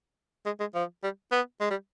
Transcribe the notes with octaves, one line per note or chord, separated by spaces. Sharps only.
G#3
G#3
F3
G3
B3
G#3
G3